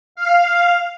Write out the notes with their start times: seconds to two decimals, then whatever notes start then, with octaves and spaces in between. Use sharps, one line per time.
0.15 F5